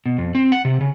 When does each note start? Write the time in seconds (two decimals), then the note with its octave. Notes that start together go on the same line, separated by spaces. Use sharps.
0.06 B2
0.18 F2
0.35 C4
0.52 F#5
0.65 C3
0.81 C#3